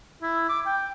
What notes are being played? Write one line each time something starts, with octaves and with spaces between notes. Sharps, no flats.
E4
D6
G5